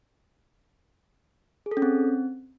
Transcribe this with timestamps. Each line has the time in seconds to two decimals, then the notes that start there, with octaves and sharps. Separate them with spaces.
1.66 G#4
1.71 A4
1.77 C#4
1.82 C4